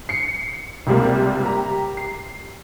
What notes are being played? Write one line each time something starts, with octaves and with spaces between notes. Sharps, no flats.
C7 C#7
C#2 C3 G3 A#3
G4 A#5
C7